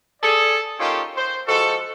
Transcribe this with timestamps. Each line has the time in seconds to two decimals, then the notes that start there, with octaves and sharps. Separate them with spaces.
0.23 G#4 A4 D5
0.78 A#3 C#4 D#4 F4 G4 A4
1.16 C5
1.47 F3 G#3 F#4 A4